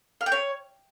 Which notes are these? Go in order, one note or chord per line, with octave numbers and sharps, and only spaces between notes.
F5
G5
C#5